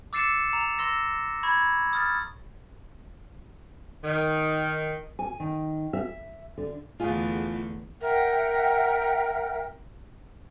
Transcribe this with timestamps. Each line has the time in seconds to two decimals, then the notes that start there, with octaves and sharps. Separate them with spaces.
0.13 D6 E6 A6 C7 C#7 E7
0.50 A#5 E7
0.79 C6 E6 A#6
1.43 B5 C#6 G#6
1.93 D#6 F6 A6
4.04 D#3
5.19 G#5
5.40 D#3
5.93 E5
6.58 D3
7.00 E2 D3 A3 F4 G#4
8.01 A#4 E5 F#5 G5